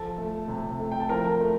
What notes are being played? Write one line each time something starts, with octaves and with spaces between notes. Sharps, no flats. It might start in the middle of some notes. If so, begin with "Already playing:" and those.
Already playing: F3 A4 A5
A3
C3
A3
G5
A5
F3 A#4 A#5
A3